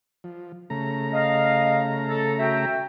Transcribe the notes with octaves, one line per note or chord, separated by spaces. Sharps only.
F3
C#3 A3 A#5
D#5 F5
A4
F#4 E5 G5